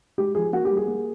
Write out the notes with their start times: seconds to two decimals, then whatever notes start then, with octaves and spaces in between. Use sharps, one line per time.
0.18 G#3 G4
0.35 F3 G#4
0.53 A#3 F#4
0.65 G4
0.71 G3
0.77 G#4
0.88 A#3